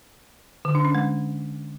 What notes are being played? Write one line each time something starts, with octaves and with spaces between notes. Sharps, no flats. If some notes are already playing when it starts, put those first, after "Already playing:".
D3
D4
C#4
G#3